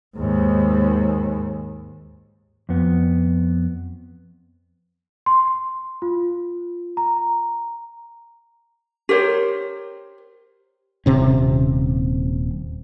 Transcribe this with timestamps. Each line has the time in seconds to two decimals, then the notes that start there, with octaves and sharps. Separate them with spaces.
0.17 D#2 G#2
2.69 F2 B3
5.26 C6
6.02 F4
6.97 A#5
9.09 G4 A#4 C5 C#5
11.06 D#1 C3 C#4